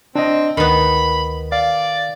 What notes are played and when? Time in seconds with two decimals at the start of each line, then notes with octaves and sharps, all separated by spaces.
0.16 C4 D4 D#5
0.57 D2 D#3 B3 B5
1.52 D5 F5